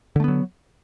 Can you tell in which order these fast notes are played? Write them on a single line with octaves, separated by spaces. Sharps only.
D3 A3 B3 F#3